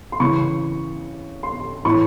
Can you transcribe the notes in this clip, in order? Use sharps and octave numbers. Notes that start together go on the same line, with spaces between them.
C6
C#3 E3 C#6
C6
A2 E3 C#6